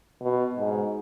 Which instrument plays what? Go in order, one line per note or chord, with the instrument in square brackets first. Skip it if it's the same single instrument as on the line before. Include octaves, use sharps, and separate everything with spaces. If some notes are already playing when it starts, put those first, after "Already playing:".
[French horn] B2
G#2